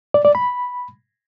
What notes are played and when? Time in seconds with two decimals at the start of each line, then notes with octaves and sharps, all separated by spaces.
0.14 D5
0.25 D5
0.35 B5